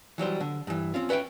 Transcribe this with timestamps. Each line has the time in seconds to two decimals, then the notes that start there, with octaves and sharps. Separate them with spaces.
0.18 E3 F#3 G3 C5
0.40 D3
0.67 G2 E3
0.94 C4 C#4 F4
1.09 C#4 B4 D5 E5 G5